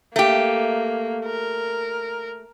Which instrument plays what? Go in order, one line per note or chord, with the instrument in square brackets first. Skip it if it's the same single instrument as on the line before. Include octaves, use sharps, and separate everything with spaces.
[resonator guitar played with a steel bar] A3 G4 [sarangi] A#3
[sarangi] A#4